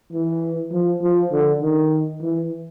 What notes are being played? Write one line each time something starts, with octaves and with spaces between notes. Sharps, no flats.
E3
F3
F3
D3
D#3
E3